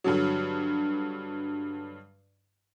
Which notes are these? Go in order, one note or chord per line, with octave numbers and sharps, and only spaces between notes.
G2 D3 F#3